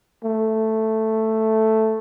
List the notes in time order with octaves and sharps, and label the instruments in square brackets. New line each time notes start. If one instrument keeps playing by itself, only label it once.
[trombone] A3